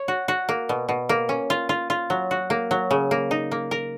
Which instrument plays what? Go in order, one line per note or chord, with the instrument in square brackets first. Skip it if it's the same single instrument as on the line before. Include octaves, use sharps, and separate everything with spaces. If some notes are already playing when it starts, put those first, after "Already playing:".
Already playing: [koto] C#5
F#4
F#4
A#3
B2
B2
A#3
C#4
F4
F4
F4
F#3
F#4
A#3
F#3
C#3
A#3
D#4
A#3
A#4